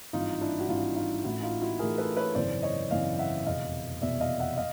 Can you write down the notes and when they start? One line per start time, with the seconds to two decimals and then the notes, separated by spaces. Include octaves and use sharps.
0.13 G#1 G2 E3 D#4 F4
0.41 D4 E4
0.60 F#4
0.68 G#1 G2 E3 D#4 F4
0.96 D#4 F4
1.24 A1 A2 E3 E4 F#4
1.43 D#4 F4
1.62 E4 F#4
1.79 A1 A2 E3 G#4 A#4
1.98 A4 B4
2.17 B4 C#5
2.35 G#1 F#2 C#3 E3 C5 D5
2.63 C#5 D#5
2.91 G#1 F#2 C#3 E3 D#5 F5
3.19 E5 F#5
3.46 F1 E2 B2 D#5 F5
4.02 F1 E2 B2 D5 E5
4.21 D#5 F5
4.39 E5 F#5
4.57 D#5 F5